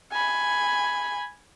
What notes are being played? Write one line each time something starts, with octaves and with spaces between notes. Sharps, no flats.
G#5 B5